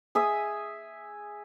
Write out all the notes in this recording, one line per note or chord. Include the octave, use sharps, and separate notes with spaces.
G#4 E5 D#6